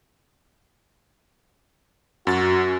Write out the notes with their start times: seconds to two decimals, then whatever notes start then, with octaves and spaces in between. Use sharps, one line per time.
2.27 F#2 F#4 A6